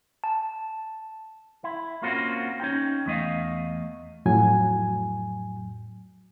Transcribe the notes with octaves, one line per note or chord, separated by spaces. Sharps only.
A5
E4
A#3 C4 C#4 F4 F#4 A#4
C#4 D#4 G5
E2 A3 D#5 F5
F2 A2 F#3 G#5